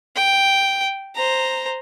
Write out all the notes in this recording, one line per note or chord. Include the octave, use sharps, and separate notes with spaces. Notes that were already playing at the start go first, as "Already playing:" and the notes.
G5
C5 A#5